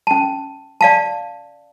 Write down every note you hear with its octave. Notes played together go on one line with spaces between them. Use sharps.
C#4 A5
D5 F5 A5